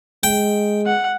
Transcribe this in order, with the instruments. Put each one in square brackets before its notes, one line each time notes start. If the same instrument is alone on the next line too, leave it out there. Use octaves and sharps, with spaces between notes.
[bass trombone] G#3 [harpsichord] G5
[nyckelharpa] F#5